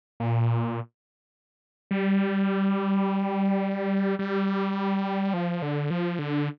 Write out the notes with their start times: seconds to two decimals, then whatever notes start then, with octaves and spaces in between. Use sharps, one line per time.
0.20 A#2
1.91 G3
4.19 G3
5.34 F3
5.62 D3
5.91 F3
6.19 D3